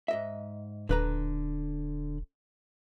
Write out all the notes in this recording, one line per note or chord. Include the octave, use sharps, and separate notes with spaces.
G#2 D#5 E5
D#1 D3 B4 A#5